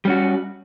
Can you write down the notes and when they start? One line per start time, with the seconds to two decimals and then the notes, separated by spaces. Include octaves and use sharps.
0.05 G3
0.07 C#4
0.10 F#4